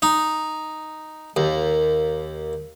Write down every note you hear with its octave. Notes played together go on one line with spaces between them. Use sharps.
D#4
D#2